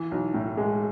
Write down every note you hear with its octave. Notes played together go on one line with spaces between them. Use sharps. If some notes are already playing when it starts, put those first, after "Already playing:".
Already playing: E3
B1
A2
G#3